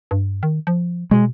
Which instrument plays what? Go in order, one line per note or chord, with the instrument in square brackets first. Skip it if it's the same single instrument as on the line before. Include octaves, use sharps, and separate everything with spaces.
[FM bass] G2
D#3
F3
[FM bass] B2 [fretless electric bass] G#3